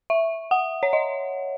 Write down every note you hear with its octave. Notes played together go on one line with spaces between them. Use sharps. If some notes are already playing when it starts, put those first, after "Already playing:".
E5
F#5
C#5
D#5